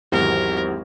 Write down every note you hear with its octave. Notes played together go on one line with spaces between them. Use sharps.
G#1 E2 F#3 E4 G4 A#4 F#5